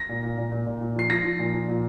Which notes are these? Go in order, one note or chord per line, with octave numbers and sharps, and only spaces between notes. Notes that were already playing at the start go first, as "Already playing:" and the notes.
Already playing: A#6
A#2
A#2
A#2
A#2
A#2
A#2
F3 C7
F3 A#6
F3
A#2
F3
A#2